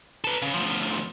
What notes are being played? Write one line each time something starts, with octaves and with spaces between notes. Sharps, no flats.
A4 B4
C#3
D2 F3